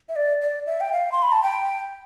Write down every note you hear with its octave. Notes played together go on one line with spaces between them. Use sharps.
E5
D5
D5
E5
G5
F5
C6
B5
A5
G5